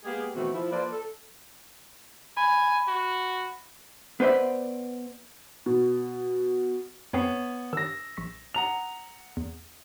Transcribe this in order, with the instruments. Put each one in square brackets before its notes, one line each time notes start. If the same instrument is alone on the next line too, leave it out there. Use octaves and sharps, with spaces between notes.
[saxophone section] G#3 A#3 B3 G4 G#4
B2 D#3 E3 A3 C4 F#4
F3 E4
F3 A#3 A4 B4 C5 D5
A4
[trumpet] G#5 [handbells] B5
[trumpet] F#4
[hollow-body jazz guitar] B3 B4 C5 D5 E5
[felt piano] B2
[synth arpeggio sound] F2 C4 C7 [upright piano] B3 C#5
[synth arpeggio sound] D#3 [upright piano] E6 A#6
[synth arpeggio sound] A#1 C#6 B6
[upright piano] F#5 A#5 F7
[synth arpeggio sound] E2